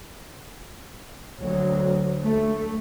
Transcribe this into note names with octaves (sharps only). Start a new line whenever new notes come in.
D2 F#3
D2 A3